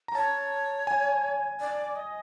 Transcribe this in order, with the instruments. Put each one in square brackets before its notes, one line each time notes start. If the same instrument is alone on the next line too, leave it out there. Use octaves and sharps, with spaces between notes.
[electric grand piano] A#5
[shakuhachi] C#5 [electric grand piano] A5
[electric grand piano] G#5
[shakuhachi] D5
D#5